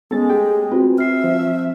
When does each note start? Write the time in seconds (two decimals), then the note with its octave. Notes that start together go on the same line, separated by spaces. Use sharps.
0.11 G#3 B3 C#4 A4 A6
0.30 A3 G4 G#4 G5
0.72 C4 F4 F#4 B4
0.98 E5 F6 C7
1.24 F3